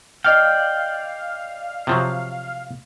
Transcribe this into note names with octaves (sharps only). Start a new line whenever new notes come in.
D5 D#5 F5 G5 F6
C3 F3 F#3